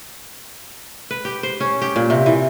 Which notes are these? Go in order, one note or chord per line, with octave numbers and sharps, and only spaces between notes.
B4
G4
C5
C#4
G4
A#2
C3
E3